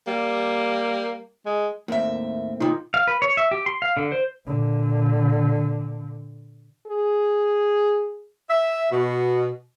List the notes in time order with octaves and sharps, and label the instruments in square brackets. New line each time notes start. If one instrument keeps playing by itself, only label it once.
[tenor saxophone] G3 [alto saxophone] A#3
[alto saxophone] G#3
[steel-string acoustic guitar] D#2 E5 [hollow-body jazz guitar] A2 A#3 C4
[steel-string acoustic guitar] C3 D#3 [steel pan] D#4 F4
[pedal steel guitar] F5
B4
C#5
E5
G4
C6
F5
D3
C5
[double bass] A#2 D3
[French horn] G#4
[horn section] E5
B2